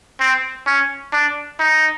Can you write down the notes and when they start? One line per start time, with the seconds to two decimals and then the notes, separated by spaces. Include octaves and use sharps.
0.20 C4
0.67 C#4
1.13 D4
1.60 D#4